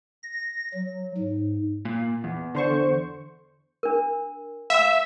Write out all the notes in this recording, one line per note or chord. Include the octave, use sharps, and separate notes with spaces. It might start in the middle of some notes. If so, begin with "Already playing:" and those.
A#6
F#3
G#2
A#2
E2
D3 C5 C#6
D4 A#4
E5 F5 G5 E6